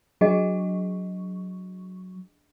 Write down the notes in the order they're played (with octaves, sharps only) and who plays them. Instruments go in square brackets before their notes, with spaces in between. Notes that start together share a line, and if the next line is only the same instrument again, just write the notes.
[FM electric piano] F#3 [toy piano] D4 G#4 D#5